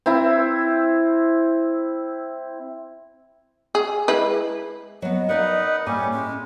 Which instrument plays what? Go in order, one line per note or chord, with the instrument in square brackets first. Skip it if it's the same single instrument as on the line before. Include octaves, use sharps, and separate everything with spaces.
[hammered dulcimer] C4 E4
[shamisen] G#4
G#3 E4 B4
[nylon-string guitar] F#3 B3 [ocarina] D#5
[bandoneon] D#4 B4 F#5 [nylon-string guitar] A#4 D5 F5
[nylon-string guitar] A2 G#5 [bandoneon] G3 C#4 G4 [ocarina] A#3
[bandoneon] G#3 [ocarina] C#4